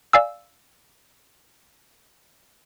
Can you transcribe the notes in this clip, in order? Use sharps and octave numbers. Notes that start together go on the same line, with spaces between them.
D5 F5 G#5 E6